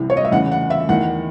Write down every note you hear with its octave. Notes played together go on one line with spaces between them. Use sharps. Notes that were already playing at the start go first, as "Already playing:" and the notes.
Already playing: C2 C3 E3
C#5
D#5
E5
E2 C#3 E3 F#5
F#5
E5
E2 D#3 F#5